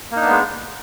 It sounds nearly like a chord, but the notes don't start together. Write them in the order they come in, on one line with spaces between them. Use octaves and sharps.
A#3 D#4 D4 B3 G#3